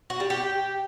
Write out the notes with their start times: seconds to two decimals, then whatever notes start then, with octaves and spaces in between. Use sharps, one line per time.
0.10 F#4
0.20 G3
0.30 G4